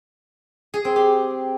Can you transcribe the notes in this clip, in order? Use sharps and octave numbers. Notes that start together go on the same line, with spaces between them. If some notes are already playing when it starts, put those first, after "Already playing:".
G#4
C4
G4